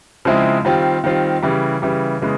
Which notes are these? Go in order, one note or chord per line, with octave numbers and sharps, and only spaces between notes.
C#3 F3 G#3 C4 E4
D#3 G3 C4 F4
D#3 G3 C4 F4
C#3 E3 G3
C#3 E3 G3
C#3 E3 G#3 B3